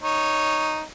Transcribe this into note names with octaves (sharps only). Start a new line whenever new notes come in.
D#4 C#5